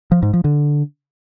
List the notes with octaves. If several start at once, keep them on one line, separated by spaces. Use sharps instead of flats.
F3
G#2
F3
D3